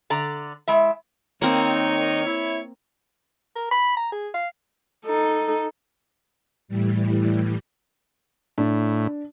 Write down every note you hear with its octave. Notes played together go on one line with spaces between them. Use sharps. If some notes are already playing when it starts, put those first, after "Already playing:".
D3 D5 A#5
G#3 E4 E5
D#3 A#3 C4 D#4 C#5
E4
A#4
B5
A#5
G#4
F5
D#4 A4
A2 E3 G3
A2 D4